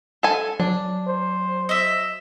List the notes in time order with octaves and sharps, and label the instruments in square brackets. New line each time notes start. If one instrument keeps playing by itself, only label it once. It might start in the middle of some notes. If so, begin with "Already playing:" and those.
[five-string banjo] A4 G#5
[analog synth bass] F#3 [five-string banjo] D4
[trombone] C5
[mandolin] D#5 E5